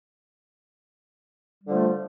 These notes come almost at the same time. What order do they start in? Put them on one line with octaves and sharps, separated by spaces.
G3 D3 F3 A3